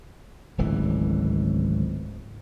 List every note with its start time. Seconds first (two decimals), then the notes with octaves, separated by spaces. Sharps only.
0.58 D1 G#1 C#2 E3